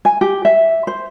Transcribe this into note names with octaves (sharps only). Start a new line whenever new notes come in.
G#5
G4
E5
C5